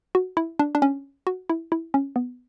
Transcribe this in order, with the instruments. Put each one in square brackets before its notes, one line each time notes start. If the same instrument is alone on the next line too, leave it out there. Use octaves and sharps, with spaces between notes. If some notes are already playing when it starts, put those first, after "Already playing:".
[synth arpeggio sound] F#4
E4
D4
D4
C#4
F#4
E4
E4
C#4
B3